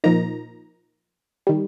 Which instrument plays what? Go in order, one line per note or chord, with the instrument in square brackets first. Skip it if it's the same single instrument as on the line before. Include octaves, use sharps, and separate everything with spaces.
[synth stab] A#2 F3 A#3 D#4 A#5
D#3 G3